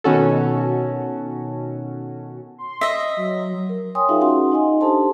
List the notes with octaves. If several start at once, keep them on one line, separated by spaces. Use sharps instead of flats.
B2 D#3 C#4 F#4 A4
C6
D#5 E5
F#3
A#4
C#5 G5 G#5 C6 D#6
D#4 F4 G#4 A#4 E5 F5
C#4 F#4 F#5 C6
D#4 D#5 G#5
D4 G4 A4 C5 A5 C6